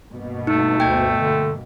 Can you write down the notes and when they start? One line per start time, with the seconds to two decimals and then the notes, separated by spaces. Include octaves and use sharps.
0.12 G2 B2 A#3
0.47 A3 D#4
0.80 D2 G5 G#6
1.18 D3